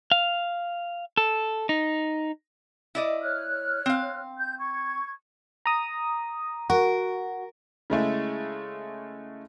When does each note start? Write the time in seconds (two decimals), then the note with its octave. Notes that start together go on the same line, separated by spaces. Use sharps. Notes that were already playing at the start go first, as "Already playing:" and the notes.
0.12 F5
1.17 A4
1.69 D#4
2.95 E4 D5 D#5
3.21 C#5 F6 F#6
3.86 C4 F5
4.37 G6
4.59 C#6 G#6
5.66 A#5 D#6
6.70 F#4 A#4
7.90 C#3 G#3 A3 E4